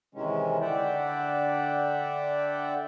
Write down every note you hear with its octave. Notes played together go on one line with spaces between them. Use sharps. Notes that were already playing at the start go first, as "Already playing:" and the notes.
C3 D#3 E3 G#3 C#4
D3 D5 E5 F#5 G5